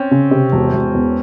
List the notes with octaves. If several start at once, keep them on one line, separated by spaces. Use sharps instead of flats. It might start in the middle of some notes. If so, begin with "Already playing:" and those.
Already playing: C4 C#4
C#3
C3
E1
E1
E2